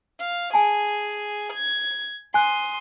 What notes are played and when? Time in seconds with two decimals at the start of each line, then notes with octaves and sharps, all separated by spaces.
0.19 F5
0.54 G#4 G#5 A5
1.53 G#6
2.34 G#5 C6 D#6 F#6